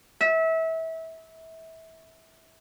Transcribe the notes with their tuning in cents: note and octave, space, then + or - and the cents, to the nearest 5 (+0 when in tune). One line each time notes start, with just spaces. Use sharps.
E5 -25